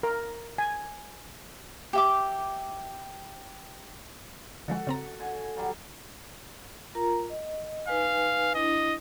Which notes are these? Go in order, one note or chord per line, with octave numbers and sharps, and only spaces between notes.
A#4
G#5
G4 E5 D6
D3 F3 G#3 F#4 A4
C#3 C4 A#5
D3 G#5
D3 F#3 G3
F4 A#4 A#5
D#5
D#4 B4 F5 G#5
D4 E4 D#5